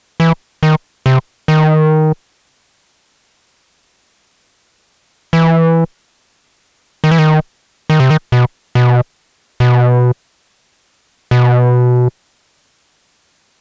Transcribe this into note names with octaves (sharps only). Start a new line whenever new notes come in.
E3
D#3
C3
D#3
E3
D#3
E3
D#3
D#3
C3
D#3
B2
B2
B2
B2